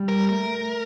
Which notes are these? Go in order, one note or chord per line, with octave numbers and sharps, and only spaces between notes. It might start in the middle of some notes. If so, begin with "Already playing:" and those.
Already playing: G3
A#4
A3 A#4